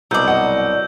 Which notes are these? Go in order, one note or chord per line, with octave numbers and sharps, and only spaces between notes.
C2 B2 F#3 D5 E6 G6
D#5 F#5